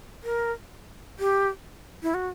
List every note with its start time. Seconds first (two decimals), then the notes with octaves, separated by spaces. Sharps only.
0.23 A#4
1.19 G4
2.03 E4
2.14 F#4